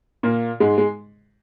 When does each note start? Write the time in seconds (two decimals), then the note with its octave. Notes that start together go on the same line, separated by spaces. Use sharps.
0.23 A#2 A#3
0.60 G#2 G#3
0.78 G#3